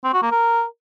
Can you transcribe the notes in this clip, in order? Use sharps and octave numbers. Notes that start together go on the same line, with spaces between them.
C4
F#4
A#3
A#4